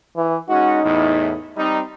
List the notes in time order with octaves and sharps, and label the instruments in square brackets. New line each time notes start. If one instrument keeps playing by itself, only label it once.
[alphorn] E3
[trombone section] G#3 C#4 F#4 [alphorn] D#4
[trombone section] E2 A2
G3 C4 D#4